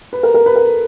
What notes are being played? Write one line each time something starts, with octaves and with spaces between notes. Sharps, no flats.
B4
A#4
A#4
B4
A#4
A4